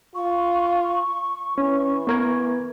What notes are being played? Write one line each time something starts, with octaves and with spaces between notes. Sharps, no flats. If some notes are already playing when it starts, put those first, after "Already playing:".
F4 C#6
E3 C#4
B3 A#4 G#6